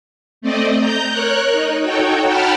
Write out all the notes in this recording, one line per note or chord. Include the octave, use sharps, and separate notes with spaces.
A3 C4 D5 D#5
A#5 G6
A#4 C#5 F#6
D#4
D#4 F#4 A4 C#5 G5
F#5 G5 A5 B5 F6